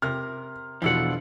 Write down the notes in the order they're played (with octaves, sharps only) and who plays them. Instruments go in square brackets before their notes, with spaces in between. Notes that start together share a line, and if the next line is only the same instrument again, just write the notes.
[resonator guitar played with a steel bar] C3 A#4 [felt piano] F6
[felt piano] E2 B2 [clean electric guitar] F3 E4 F#5 [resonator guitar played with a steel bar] D4 F4 A4